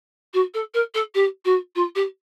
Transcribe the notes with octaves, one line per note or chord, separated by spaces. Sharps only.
F#4
A4
A#4
A4
G4
F#4
F4
G4